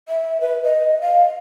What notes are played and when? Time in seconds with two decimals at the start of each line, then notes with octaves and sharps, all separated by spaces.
0.09 E5
0.41 B4
0.64 D#5
1.01 F5